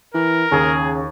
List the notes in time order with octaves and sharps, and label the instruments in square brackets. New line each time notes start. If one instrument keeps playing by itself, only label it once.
[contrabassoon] E3 [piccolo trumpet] A#4
[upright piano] D#2 [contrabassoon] C#3 [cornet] G#4